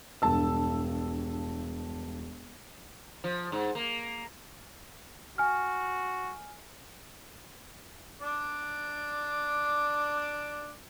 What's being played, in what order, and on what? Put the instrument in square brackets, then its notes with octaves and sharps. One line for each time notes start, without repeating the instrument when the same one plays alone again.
[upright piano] E1 G2 A5 E6
[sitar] F3
G#2
A#3
[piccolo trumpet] F#4 [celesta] G#5 F6
[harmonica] D4 D5